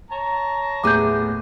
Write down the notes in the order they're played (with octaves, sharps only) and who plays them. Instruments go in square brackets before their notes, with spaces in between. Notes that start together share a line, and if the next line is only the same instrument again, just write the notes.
[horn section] C#5 A5 A#5
[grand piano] D#2 A2 B3 [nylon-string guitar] A3 G#4 [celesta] D6 G6